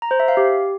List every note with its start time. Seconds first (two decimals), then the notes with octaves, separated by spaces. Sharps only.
0.02 A#5
0.11 C5
0.20 E5
0.28 F5
0.37 G4